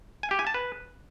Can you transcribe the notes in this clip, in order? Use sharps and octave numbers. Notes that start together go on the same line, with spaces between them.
G#5
G4
G#5
A5
B4